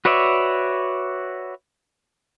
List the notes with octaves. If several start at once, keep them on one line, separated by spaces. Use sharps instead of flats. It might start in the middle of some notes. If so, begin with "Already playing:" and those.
F#4 B4 C#5 D5 E5